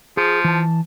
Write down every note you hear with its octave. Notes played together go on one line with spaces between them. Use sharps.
F3 G#4
E3 A5